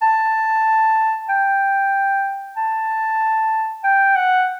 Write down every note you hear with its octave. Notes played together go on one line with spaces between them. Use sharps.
A5
G5
A5
G5
F#5